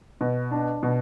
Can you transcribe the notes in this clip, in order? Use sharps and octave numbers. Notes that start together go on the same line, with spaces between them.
B2
D4
B2